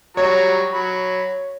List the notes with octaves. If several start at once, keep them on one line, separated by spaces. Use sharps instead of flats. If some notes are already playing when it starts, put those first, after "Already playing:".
F#3 G3 C#5 A#5
F#3 B5